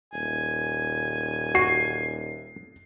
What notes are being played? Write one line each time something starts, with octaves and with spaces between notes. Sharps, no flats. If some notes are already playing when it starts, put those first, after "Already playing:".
D#1 G#5
F#4 C7